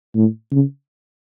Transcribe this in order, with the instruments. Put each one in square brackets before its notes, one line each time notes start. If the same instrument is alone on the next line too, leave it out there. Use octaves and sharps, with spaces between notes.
[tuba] A2
C#3